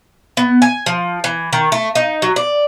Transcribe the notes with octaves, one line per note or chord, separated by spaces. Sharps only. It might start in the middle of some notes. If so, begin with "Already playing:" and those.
B3
G#5
F3
E3
D#3
A3
D#4
F#3
D5